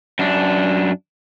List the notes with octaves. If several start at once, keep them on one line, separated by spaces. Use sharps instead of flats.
F#2 D4